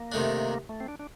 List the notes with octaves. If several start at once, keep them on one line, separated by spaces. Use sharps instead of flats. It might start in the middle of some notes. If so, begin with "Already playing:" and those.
Already playing: A#3
C3 D#3 A3 D4
A3
C4
D4
D4